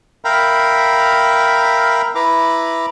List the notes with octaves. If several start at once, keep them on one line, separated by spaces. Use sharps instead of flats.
A#4 E5 F5 G5 A#5 B5
E4 B4 A#5 D6